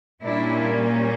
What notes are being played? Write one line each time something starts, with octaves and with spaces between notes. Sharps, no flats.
A#2 G3 A#3 C#4 D4 E4